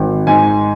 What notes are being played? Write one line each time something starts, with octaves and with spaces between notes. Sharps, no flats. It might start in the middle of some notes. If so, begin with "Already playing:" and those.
Already playing: G#1
G#2 G#5